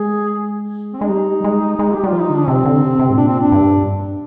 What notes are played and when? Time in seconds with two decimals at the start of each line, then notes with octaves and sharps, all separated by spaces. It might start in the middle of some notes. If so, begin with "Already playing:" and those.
Already playing: G#3 G#4
0.93 C4
1.01 G#3 D4
1.09 G3 D#4
1.44 G#3
1.79 G#3
1.93 G4
2.04 G3 F4
2.13 F3
2.21 D#4
2.30 D3 D4
2.48 C3 C4
2.65 D3
2.82 C3
2.99 C3
3.10 G#2
3.17 A#2 D4
3.28 C4
3.40 D4
3.52 G2